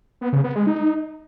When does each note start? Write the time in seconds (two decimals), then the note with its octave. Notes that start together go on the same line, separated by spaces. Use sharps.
0.21 B3
0.33 C#3
0.44 B3
0.55 G#3
0.67 D#4